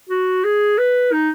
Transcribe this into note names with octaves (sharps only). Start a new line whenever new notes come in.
F#4
G#4
B4
D#4